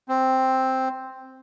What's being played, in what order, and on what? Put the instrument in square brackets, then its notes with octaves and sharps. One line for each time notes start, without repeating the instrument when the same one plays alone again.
[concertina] C4